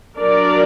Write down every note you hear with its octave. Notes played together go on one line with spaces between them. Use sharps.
F#3 D4 A#4 D5